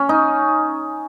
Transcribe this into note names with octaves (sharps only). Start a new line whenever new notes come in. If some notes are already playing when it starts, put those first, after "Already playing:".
Already playing: C#4
D#4